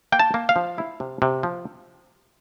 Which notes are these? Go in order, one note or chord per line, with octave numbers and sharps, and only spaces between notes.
A#3 G5
A5
A#3
F5
F3
E4
C3
C3
F3